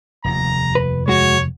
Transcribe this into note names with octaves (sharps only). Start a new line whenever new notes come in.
F1 D#2 A#5
B4
G#3 F#4 C#5